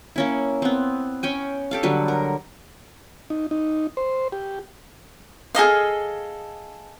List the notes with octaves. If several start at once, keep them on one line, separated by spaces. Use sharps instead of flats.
A#3 C#4 E4
B3 C4
C#4 G5 G#5
G4 A4 F5
D3 F#3 G3 B4
A#4
D#4
D#4
C5
G4
G#4 A4 D#5 F5